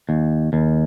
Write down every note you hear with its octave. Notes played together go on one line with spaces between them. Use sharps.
D#2
D#2